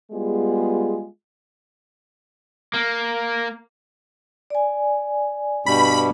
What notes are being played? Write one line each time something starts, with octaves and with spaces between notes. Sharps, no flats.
G3 G#3 B3 F4 G#4
A#3
D5 G#5
G2 B2 G3 B5